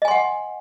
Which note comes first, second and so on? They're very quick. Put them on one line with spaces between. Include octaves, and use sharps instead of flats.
D#5 G#5 C6 F#5